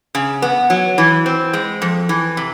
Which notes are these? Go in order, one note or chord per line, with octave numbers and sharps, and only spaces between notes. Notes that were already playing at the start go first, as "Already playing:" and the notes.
C#3
B3
F#3
E3
C4
G#3
F2
E3
C3